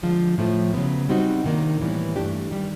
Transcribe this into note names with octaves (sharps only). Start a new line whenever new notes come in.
D3 F3 G#3
A2 F3 A3
C#3 F#3 B3
G3 C4 D#4 F#4
C3 D#3 G3 A#3 D4
A2 E3 G3 B3
G2 E3 A3 D4 G4
D#3 G3